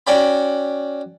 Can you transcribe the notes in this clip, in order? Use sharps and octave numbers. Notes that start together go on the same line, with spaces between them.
C#4 F#4 D5 G5 B5